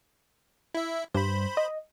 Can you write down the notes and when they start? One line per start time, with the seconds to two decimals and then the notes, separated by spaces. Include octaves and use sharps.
0.75 E4 E5
1.14 G2 C5 B5
1.57 D#5